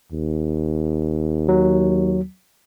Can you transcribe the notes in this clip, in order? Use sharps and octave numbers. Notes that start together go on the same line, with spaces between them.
D#2
F#3